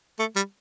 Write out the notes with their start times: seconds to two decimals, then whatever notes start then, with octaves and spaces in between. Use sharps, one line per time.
0.19 A3
0.36 G3